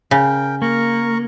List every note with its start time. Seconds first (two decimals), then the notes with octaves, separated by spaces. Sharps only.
0.11 C#3 A#4 G5
0.62 A#3 A#4 A#5 C#6